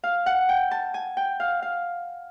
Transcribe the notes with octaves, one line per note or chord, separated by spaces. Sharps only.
F5
F#5
G5
A5
G#5
G5
F5
F5